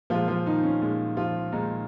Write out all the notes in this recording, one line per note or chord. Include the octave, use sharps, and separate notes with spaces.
A#2 F3 G#3 F4
F3 F4
D#3 D#4
C#4
A#2 G#3
F3 F4
A#2 D#3 G#3 D#4